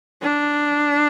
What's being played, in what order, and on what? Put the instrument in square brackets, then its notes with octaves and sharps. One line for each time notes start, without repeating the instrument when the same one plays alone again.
[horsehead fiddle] D4